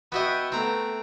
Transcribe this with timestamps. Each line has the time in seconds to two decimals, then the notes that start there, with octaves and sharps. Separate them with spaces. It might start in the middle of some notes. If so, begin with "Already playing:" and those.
0.12 B3 F#4 D#5 E5 G5
0.52 A3 B3 C4 A#5